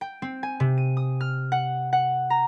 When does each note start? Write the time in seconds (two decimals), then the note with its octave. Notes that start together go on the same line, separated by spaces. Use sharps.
0.01 G5
0.22 C4
0.43 G#5
0.60 C3
0.78 D#7
0.97 D#6
1.21 F6
1.52 F#5
1.93 F#5
2.30 A#5